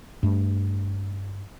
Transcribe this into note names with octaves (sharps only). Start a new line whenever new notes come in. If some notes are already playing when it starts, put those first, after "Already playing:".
G2 A3